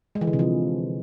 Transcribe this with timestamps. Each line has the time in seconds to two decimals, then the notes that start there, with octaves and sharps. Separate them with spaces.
0.15 G#3
0.21 E3
0.27 D3
0.33 C3
0.39 F3